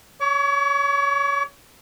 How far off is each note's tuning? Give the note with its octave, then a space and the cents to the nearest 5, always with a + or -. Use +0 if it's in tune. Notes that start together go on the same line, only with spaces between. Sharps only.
C#5 +20 D6 -45